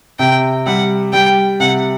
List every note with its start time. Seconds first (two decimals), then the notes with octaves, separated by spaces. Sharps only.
0.19 C3 G5
0.66 G3 F#5
1.13 G3 G5
1.60 C3 F#5